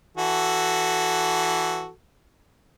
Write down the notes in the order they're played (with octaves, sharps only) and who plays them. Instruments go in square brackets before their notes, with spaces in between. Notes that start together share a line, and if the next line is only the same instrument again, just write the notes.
[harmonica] E3 F#4 A4